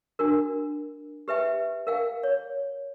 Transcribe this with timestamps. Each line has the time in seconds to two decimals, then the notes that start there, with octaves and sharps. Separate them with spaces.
0.19 D4 F#4 A#4
1.28 G4 B4 E5 G5
1.87 A#4 F5 G5
2.23 C#5